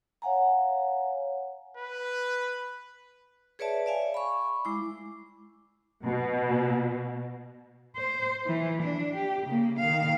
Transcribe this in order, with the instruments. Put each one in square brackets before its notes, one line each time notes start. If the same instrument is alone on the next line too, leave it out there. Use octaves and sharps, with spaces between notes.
[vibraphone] C#5 F5 F#5 G#5 A#5
[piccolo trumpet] B4
[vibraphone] G#4 B4 C#5 D5 E5 A5
D5 E5 F5 G#5
B5 C#6
G#3 E4 D6
[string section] B2
[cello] C5
E3
D4
G4
C#3 A#3
D#3 F5